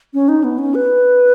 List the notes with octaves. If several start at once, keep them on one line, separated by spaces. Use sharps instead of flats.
C#4
D#4
B3
C#4
B4